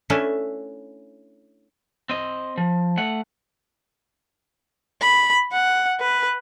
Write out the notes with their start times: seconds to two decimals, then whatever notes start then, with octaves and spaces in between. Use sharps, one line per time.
0.10 A3 C#4 D4 E4 A4 G#5
2.10 C4 D#5
2.58 F3
2.97 A3 F#5
5.01 B5
5.53 F#5
6.01 B4